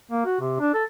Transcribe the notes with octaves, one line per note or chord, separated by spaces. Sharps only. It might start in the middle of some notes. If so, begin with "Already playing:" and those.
A#3
F#4
C3
D4
A4